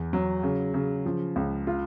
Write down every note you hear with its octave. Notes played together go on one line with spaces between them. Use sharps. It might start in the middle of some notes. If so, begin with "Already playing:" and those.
Already playing: E2
F#3
C#3
C#3
F3
C#2
F4